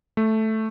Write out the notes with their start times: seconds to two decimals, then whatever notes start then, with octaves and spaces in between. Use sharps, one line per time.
0.17 A3